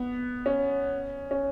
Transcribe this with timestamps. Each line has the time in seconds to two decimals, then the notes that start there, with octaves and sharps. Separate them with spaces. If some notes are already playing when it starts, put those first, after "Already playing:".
Already playing: B3
0.46 C#4
1.31 C#4